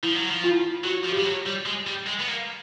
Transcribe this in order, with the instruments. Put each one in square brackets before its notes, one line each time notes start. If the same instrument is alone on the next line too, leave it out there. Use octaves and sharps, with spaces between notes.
[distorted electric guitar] F3 [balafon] E4
[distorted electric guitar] F#3
F3
[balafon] F4
E4
F4
[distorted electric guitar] F#3 [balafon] F#4
[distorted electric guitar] F3
[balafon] G4
[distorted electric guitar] G3
F#3
G3
G#3
G3
G#3
B3
A#3